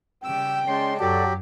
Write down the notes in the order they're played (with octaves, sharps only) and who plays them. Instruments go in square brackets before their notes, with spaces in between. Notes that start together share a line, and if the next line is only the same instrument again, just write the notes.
[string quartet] C#3 G3 D6 [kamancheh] G5 [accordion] E6
[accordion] G#3 [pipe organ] C#4 C6 [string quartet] D5 A5
[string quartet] F#2 [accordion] F#3 G4 [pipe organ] F#4 A4 D5